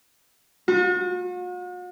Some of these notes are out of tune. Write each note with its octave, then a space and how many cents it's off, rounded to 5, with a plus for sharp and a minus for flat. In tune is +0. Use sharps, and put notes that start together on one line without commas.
F#4 -45